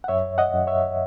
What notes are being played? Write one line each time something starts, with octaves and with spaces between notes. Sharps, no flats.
F#5
F#2 C#5 E5
D#5 F#5
F#2
C#5 E5